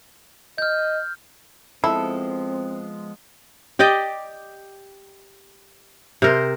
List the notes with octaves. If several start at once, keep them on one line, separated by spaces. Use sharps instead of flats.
D#5 F6 G6
F3 G#3 B3 C4 E4 A4
G4 D5 D#5 G5
C3 A#4 C5